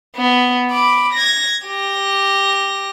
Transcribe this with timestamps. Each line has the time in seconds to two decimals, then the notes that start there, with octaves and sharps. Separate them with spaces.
0.16 B3
0.71 B5 D6
1.13 G#6 A#6
1.67 G4 A#6